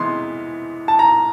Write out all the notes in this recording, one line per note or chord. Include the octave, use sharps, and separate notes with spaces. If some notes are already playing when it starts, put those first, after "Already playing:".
Already playing: C3 E3 G#3 B3 C6
A5
A#5